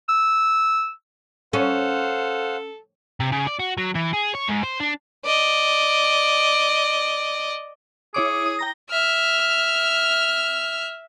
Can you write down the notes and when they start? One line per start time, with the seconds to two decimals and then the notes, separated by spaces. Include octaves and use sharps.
0.08 E6
1.53 C#4 A4 C5 F5 F#5
3.20 C3
3.32 C#3
3.47 D5
3.59 F#4
3.77 F#3
3.95 E3
4.13 G#4
4.34 C#5
4.48 G#2
4.63 C5
4.80 D4
5.25 D5 D#5
8.14 E4 G#4 C#5 D6
8.46 D#6
8.59 G5 A#5 A#6
8.89 E5 F6